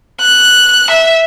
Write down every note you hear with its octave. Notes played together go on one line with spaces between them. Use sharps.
F#6
E5